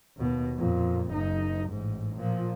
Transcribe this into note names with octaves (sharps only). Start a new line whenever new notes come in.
D#2 B2
F2 A#2
F#1 D#4
A1 G#2
A#2 F3